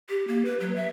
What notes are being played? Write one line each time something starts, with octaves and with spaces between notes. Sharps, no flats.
G4
A#3
B4
F#3
E5